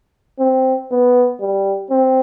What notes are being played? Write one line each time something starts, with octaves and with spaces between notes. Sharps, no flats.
C4
B3
G3
C4